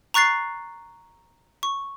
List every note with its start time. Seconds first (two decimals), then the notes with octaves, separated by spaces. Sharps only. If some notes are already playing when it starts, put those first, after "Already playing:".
0.14 A#5 C#6 F#6 A6 C7
1.63 C#6